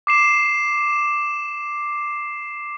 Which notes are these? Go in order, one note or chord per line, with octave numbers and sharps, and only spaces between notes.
D6 C7 E7